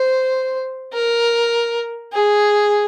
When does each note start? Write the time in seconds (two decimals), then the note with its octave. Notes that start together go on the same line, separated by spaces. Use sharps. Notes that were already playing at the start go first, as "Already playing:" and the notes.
Already playing: C5
0.93 A#4
2.12 G#4